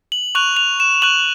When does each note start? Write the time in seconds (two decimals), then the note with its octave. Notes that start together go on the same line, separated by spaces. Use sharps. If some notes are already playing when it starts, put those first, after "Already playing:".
0.12 F#7
0.35 C#6 F#6 F7
0.57 F7
0.80 E7
1.02 C#6 F#6 F#7